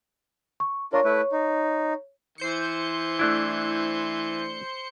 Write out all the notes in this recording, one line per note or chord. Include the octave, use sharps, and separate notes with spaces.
C#6
D4 F4 A#4 C#5 C#6
A3 E4 B4
D#4
E3 C5 G6 C#7
A3 D4 E4